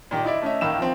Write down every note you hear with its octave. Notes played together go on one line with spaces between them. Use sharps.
A#2 D#3 G4
D#4 E4 D5 E5
A3 C#4 D#5 E5
A2 D#3 A#3 E6 E7
F3 C4